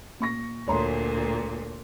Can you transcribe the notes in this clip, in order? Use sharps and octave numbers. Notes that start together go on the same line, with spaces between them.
A#2 C#6 A#6
D2 A#2 C#5 A#5 C6